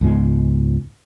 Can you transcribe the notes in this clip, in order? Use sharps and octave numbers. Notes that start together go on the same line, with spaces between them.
C#2 G#2 G#3 B3